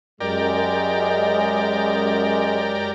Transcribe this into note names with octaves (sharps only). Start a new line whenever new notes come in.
F#2 G#3 G4 A#4 D5